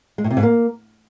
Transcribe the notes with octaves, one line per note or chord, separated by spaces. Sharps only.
G#3
A2
C3
G#2
A#3